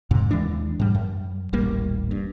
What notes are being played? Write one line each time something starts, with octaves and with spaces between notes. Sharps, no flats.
F2 G#2 C3
D#2 E3 G#3 D4
G#2 G3
F#2
D#1 A1 G3 A#3
G2